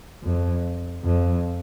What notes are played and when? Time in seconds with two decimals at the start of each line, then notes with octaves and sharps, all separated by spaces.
0.24 F2
1.04 F2